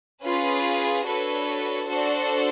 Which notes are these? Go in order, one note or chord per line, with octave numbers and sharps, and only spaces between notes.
C#4 F4 G#4 B4
D4 F#4 A4 B4 C#5
D4 F#4 A4 C5 D5